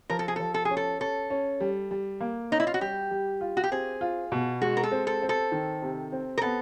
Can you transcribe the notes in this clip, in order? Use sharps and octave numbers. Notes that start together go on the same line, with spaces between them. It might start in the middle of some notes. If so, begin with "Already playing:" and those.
F3 A#4
A4
G#4
F3 A4
A4
C#4 G#4
A4
C#4 A4
C#4
G3
G3
A#3
C#4 D#4
E4
F4
F#4
G3 G4
G3
F4
F#4
G4
C4 G#4
F4
B2
G#3 F#4
A#4
A4
C4
A4
C4
A4
D#3
C3
C4
A#4
B3 A4